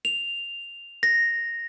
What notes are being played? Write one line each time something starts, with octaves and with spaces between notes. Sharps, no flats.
F7
A#6